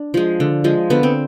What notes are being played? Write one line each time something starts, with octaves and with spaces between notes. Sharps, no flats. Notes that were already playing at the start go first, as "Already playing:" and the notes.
Already playing: D4
F3 G#3
D3
F3 G#3
D3 B3
C4